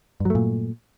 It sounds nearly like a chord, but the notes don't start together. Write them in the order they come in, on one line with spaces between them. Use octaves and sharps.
G2 F#3 A3 A#2